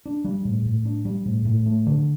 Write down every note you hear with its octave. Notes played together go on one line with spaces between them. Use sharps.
D4
G3
A2
A2
D4
G3
A2
A2
A3
D3